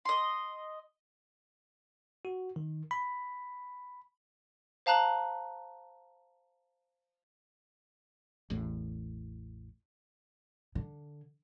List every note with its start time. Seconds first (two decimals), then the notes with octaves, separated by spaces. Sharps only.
0.05 D#5 C6
2.25 F#4
2.56 D#3
2.91 B5
4.86 C5 F5 A5 A#5 F#6 F#7
8.50 A1 E2 A2
10.75 D3